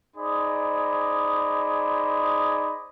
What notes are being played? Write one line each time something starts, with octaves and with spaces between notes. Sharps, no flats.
D#4 G#4 C5 D5 D#5 B5